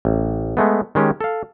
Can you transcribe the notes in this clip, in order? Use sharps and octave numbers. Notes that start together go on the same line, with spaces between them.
A1
G#3 A3 B3
D#3 G#3 C#4 G4
A4 F5